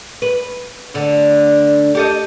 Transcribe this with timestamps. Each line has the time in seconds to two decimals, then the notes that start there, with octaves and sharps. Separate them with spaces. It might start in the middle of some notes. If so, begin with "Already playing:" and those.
0.22 B4
0.94 D2 D3
1.95 G4 A4 D#5